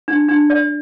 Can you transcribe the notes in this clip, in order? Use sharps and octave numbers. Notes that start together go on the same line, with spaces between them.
D4
D4
D5